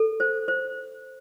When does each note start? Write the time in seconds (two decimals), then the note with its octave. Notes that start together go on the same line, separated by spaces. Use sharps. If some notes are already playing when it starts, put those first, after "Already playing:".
Already playing: A4
0.20 C5
0.48 C5